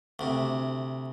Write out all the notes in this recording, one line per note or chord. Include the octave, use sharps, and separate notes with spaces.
D2 C3